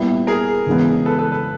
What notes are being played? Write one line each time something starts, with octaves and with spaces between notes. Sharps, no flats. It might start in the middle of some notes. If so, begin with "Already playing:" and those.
Already playing: A#2 G3 B3 E4
G#4 A#4
C#3 E3 G#3 B3
A4 B4
A4 B4
A4 B4